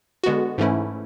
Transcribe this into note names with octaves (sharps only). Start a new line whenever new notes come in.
D3 G#3 B3 F#4
G#2 E3 A3 C#4 E4